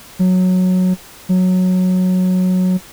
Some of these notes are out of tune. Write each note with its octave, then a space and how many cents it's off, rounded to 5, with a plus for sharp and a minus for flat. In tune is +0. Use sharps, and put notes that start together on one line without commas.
F#3 -10
F#3 -10